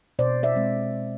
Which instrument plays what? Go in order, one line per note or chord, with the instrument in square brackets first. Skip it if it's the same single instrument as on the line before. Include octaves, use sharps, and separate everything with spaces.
[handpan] B2 C5 D5
D5 E5
G#3 C4